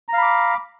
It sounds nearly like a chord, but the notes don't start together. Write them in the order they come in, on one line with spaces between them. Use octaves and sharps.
A#5 F5 B5 D6